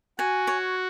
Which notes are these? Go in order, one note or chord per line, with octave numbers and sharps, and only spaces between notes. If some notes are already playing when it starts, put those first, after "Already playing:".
F#4 G#5
C#5